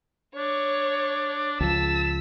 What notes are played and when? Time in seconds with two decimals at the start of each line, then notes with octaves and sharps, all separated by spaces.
0.35 D4 C#5 C#6
1.60 C#2 F3 A5 E6 B6